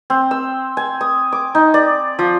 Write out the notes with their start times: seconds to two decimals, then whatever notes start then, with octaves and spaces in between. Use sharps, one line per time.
0.10 C4
0.31 E6
0.77 G#5
1.01 D#6
1.32 D6
1.55 D#4
1.74 D5
2.19 F3